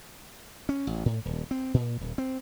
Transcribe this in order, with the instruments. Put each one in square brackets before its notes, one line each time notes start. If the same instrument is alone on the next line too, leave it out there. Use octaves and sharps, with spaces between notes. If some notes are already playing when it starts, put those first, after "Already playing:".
[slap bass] C#4
A1
A2
D#1
C4
A#2
D#1
C4